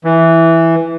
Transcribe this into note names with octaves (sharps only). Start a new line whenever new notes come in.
E3